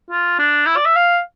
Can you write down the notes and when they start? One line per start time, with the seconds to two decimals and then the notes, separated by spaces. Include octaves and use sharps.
0.11 F4
0.39 D4
0.66 E4
0.76 D5
0.86 E5
0.96 F5